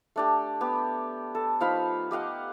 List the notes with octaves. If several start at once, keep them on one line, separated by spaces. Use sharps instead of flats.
A3 D4 G4
B3 G4
A4
F3 D#4 F5 B5
G4 D#5 F5 F#5